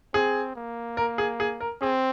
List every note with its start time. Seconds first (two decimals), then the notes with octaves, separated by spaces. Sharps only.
0.14 C4 G#4
0.56 A#3
0.97 A#4
1.18 G#4
1.40 G#4
1.60 A#4
1.81 C4 G#4